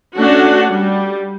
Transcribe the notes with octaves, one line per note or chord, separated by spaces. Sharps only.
A3 C#4 D4 F#4 F#5
G3